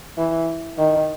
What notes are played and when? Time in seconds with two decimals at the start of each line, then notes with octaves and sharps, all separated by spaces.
0.18 E3
0.78 D#3